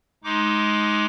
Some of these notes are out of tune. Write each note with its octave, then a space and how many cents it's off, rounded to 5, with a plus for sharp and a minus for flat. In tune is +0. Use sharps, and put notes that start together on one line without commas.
G#3 +20 D#4 +10 D6 -10